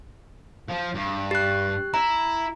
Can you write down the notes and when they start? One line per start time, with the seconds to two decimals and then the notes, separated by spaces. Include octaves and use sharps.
0.69 F3
0.94 G2
1.31 G4 F#6
1.94 E4 A#5